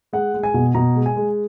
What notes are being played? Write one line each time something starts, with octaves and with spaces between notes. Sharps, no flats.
G#3 F#5
G#3
G#5
B2
B2 A#5
G#3
G#5
G#3